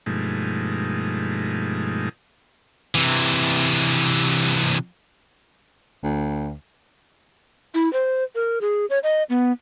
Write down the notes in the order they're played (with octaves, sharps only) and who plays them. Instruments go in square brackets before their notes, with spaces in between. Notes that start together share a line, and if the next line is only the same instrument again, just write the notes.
[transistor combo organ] G2 B2 F3 G#3 A3 D#4
[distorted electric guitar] C3 E3
[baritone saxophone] D2
[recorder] E4
C5
A#4
G#4
C#5
D#5
B3